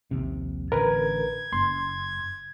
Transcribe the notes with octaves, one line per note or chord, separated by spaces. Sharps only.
A#1 D#2 C3
A1 D3 A#4 B4 G#6
F#1 C6